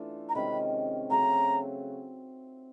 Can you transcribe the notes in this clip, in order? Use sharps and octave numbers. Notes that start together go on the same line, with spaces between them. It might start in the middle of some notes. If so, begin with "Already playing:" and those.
Already playing: E3 A3 D4 F4
A#5
C3 D#3 G#3 C#4 B5
C#3 F#3 A3 C4 A#5